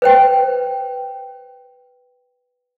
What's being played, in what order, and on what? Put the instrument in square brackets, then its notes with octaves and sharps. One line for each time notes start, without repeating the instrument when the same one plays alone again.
[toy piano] B4 C5 G5